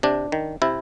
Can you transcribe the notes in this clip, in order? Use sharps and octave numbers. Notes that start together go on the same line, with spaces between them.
C3 D4
D#3
C3 E4